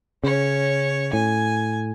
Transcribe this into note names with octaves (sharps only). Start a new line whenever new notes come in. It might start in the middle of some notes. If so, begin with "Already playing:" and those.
C#3 C#4 C#5
A2 G#5